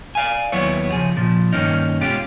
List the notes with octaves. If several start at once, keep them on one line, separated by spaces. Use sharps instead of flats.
D5 F5 G#5
D#2 F#3 B3 E4 C#5
C#3 F3 G#4
A#2 F3
G2 B2 D#3 A#3 C#4 D#4
B2 G#3 C#4 F4 G4